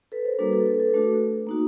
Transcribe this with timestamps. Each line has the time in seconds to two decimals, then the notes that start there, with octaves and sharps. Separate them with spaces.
0.12 A4 B4
0.25 A#4 C5
0.39 G3 A#3 D4 F#4 A4 B4
0.53 A4 B4
0.66 A4 B4
0.80 A4 B4
0.94 A3 D4 F#4
1.47 A#3 D#4 F#4